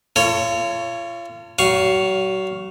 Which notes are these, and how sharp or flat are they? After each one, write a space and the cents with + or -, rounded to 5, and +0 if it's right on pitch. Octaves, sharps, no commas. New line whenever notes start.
F4 -35 A4 +30 C#5 +0
F#3 +40 F5 +0 C#6 +0